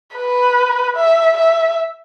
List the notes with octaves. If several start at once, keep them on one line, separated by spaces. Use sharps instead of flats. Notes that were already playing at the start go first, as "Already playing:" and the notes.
B4
E5
E5